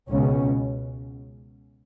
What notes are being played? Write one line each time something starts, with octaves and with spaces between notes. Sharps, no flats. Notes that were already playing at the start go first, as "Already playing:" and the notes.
C#2 B2 C#4